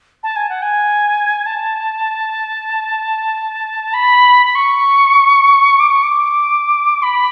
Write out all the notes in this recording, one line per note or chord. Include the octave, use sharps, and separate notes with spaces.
A5
G#5
F#5
G#5
A5
B5
B5
C#6
D6
C#6
D6
B5